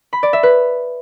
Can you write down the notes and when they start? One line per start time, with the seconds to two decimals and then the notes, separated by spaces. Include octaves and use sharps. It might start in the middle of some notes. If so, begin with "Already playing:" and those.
0.13 B5
0.23 D5
0.33 E5
0.43 B4